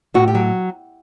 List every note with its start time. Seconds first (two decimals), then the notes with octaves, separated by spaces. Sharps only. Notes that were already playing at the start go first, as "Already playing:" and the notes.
0.14 A2 F#4
0.28 G4
0.35 F#3